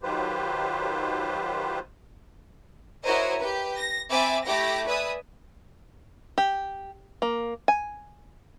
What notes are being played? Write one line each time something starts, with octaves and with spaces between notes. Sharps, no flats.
D#3 F#3 F4 G4 B4 C5
E4 F#4 A#4 C5 C#5 D#5
G4 B4
A#6
C4 E5 G#5 B5 D6 A6
A3 E4 G4 G5 D6 A#6
B4 D5 E5 G#5 D#6
G4
A#3
G#5